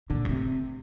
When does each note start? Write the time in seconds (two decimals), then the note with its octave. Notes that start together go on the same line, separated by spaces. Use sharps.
0.10 A#2 D3
0.25 G#2
0.29 A2 C3